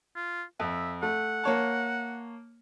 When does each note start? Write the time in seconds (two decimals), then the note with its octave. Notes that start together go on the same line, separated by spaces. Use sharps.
0.16 F4
0.60 F2 E5
1.03 A3 F#5
1.44 A#3 C#5 A5